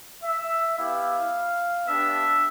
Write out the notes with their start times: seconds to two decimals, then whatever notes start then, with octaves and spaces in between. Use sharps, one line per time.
0.22 E5
0.77 B3 E4 G4 F5
1.86 B3 D4 G4 E5